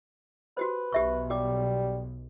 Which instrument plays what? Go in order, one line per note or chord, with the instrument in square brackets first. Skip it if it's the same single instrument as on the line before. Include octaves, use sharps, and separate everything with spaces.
[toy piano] F#4 G4 C5 [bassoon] B4
[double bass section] B1 [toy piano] G4 E5 C#6
[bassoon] G3 [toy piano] G4 D6